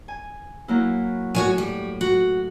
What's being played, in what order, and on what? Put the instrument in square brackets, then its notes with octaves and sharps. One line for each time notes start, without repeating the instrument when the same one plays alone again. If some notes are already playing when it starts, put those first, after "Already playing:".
[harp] G#5
F#3 A#3 E4
[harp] A2 [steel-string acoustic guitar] F#4 C#5 G#5
[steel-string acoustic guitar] G3
F#4